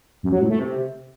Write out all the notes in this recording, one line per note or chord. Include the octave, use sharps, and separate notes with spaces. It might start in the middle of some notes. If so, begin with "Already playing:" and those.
F#2
F#3
A2
A3
C3